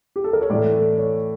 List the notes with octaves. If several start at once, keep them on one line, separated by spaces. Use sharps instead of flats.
G4
A4
A#4
C#5
A2 E3 A3 D5
C#5